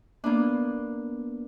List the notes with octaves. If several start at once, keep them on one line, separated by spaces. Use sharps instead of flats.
A#3 B3 D4